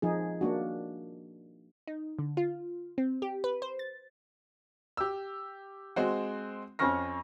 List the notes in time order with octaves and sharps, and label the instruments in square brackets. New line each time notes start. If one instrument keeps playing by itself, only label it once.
[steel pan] F3 D#4 G#4
A#3 D4 F#4
[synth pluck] D#4
D3
F4
C4
G4
B4
C5
A6
[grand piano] G4 E6
G#3 C4 F#4
F2 C4 C#4 C#6 F6 A#6